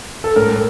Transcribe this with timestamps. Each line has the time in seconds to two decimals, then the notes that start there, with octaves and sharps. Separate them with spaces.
0.24 A4
0.36 A2 A#4